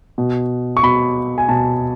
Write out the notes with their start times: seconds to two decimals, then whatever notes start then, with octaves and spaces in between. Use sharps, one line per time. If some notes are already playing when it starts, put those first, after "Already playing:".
0.18 B2
0.77 C#6
0.83 B2 B5
1.38 G#5
1.49 B2 A5